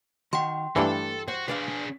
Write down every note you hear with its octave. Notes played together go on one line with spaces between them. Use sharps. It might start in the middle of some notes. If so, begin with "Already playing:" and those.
D#3 F#4 G5 C6
G2 E3 A3 D4 A4 F5
F#4 C5
D4 G#4 B4 D5 F5